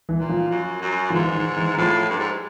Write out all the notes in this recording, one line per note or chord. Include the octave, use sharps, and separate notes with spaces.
E3
A#2
F3
F#2
F#2
F3
G#2 E3
D#3
E3
A2 F3
G2
G#2